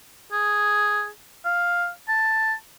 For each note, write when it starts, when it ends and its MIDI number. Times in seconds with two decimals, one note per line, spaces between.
0.32 1.08 68
1.45 1.89 77
2.08 2.54 81